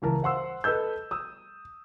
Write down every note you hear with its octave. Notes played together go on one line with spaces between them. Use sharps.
C#2 E3 A#4 A5
C5 F5 F#5 C6 E6
A4 B4 D#5 E6 G6
D#6 E6